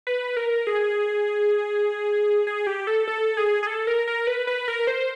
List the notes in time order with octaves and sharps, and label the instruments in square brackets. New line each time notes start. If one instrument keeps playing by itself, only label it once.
[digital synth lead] B4
A#4
G#4
G#4
G4
A4
A4
G#4
G#4
A4
A#4
A#4
B4
B4
A#4
C5